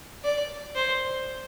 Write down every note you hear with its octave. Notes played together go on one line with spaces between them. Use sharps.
D5
C5